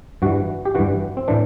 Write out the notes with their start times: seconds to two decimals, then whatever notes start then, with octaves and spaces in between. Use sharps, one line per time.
0.22 G2 E3 F#4
0.65 G4
0.75 G2 E3 F#4
1.17 C4
1.28 A2 E3 D4